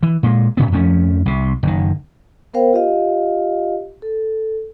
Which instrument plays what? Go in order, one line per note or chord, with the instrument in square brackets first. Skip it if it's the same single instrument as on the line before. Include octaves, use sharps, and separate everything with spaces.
[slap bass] E3
A#2 G#3
A2 C#3 B3
F2 F3 A3 C#4
C2 C3
F#1 D#3
[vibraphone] B3 A#4 C5 F5 G5
F4 G4 D#5 F5
A4